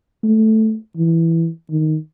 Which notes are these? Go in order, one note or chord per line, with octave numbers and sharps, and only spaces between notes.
A3
E3
D#3